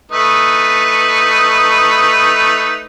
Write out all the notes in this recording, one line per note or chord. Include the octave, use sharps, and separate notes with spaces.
A3 D#4 B4